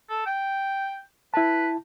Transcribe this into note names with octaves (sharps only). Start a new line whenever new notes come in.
A4
G5
E4 B4 A5